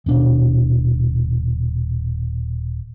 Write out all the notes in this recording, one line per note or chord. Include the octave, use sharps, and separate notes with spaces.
D#1 B2 D4